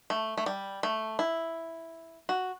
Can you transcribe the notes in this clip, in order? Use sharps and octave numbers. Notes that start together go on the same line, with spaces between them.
A3
A3
G3
A3
E4
F#4